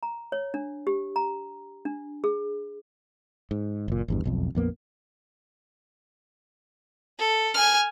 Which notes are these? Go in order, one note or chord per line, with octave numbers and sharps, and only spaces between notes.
A#5
C#5
D4
G4
A#5
D4
G#4
G#2
F#1 A#2
G#1 E2 G2
E1 B1 F2
A#1 F2 A#3 B3
A4
G#5 F6